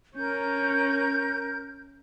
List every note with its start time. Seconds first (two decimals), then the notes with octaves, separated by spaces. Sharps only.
0.16 C#4 A#4 G6